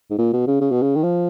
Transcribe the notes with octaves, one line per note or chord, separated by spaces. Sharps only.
G#2
A#2
B2
C#3
C#3
B2
C#3
D#3
F3